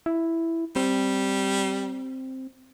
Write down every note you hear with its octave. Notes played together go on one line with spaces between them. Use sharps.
E4
G3 C4